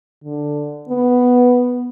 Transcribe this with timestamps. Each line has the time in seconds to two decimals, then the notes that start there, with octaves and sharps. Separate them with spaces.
0.24 D3
0.89 B3